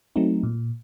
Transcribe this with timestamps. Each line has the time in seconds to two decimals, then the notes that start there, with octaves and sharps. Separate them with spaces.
0.16 F#3 A3 C4 D#4
0.43 A#2